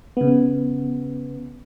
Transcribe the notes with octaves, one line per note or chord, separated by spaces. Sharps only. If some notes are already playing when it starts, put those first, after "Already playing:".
C#3 B3